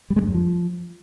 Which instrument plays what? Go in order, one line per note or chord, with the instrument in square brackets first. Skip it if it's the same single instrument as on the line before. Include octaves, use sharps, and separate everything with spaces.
[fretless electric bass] G3
G#3
G2
F#2
F3